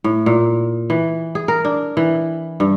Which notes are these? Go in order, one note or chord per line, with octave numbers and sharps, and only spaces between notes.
A2
A#2
E3
G#4
A#4
D4
E3
G2